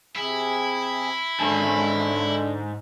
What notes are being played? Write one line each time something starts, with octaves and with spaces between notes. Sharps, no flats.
C3 E4 G#4
G#2 D3 C#4 G#4 A5